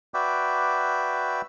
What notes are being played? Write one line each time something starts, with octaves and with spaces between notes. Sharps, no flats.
F#4 B4 D5 E5 G5 D6